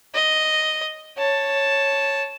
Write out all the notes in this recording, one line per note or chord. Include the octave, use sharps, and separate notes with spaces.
D#5
C#5 A5